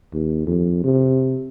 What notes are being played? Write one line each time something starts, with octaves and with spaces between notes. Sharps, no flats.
D#2
F2
C3